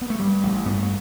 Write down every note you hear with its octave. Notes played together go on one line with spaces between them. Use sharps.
B3
A3
G2 G3
A1
G2 B3
A3